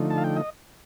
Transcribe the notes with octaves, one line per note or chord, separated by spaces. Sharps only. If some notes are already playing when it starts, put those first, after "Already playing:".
Already playing: D3 F3 A3 D#4
A5
F5
G5
D#5